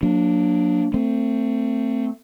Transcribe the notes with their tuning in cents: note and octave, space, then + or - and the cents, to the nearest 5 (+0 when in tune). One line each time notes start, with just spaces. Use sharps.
F#3 -35 A#3 +0 D4 +0
A3 +25 C4 +0